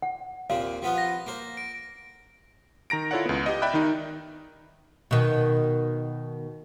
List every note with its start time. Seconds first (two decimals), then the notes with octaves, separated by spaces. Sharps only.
0.02 F#5
0.50 D#2 A#2 C4 F5
0.82 F3 B3 F4
0.98 A#6
1.26 A#3 C5
1.57 D7
2.90 D#3 A#5 A#6 D7
3.11 E4 F4 A4 C#5 D5 F#5
3.26 C#2 B3
3.46 G4 D#5
3.62 D5 E5 G5 B5 F#6
3.74 D#3 D#4
5.11 B2 D#3